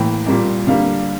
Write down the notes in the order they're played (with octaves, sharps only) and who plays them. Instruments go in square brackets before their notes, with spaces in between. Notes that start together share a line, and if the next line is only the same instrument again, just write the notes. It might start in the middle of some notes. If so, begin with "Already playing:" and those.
Already playing: [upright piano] A2 E3 A#3 G5
A#2 G3 A#3
D3 G3 A#3 F5